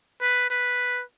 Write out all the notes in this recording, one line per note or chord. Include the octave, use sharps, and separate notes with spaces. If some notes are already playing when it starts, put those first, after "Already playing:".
B4
B4